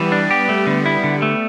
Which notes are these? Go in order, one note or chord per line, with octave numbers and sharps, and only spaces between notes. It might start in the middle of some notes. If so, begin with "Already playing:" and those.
Already playing: E3 G3 B3
D4
G4
A3
D3
E4
D3
A3